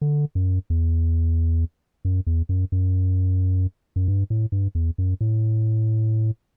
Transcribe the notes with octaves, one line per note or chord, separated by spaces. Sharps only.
D3
F#2
E2
F#2
E2
F#2
F#2
F#2
G2
A2
G2
E2
F#2
A2